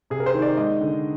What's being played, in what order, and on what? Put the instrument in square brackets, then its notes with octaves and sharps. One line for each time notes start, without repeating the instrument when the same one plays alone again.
[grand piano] C3 G#4
A#4
C5
D#3
D5
G#3 D#5
D3